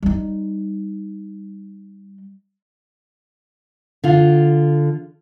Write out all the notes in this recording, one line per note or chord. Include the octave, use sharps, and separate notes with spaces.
G3 D#4
D3 F4